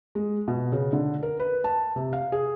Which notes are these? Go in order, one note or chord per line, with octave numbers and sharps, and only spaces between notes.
G#3
B2
C#3
D3
A#4
B4
A5
C3
F5
G#4